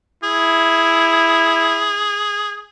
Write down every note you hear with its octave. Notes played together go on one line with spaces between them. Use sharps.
E4 G#4